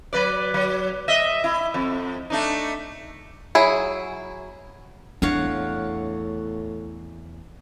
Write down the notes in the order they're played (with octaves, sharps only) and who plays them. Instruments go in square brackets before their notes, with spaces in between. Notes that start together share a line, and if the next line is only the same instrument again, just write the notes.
[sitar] F#3 B4 D5
F#3
D#5 E5
E4
F2
A3 D4 D#4
[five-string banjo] F#3 E4 G#4
[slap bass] E2 [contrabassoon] A2 [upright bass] D4 [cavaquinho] C#5 F5 F#5